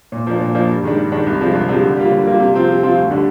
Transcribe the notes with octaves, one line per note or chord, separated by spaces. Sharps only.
A#2
F3 A#3 D4
A#2
F3 A#3 D4
G2
D#3 G#3 D4
G2
D#3 G#3 D4
C2
C3 F3 G#3 D4
C2
C3 F3 G#3 D4
D3
G3 A#3 F4
D3
G3 A#3 F4
C3
F3 C4 F4
C3
F3 C4 F4
D2
D3 G3 D4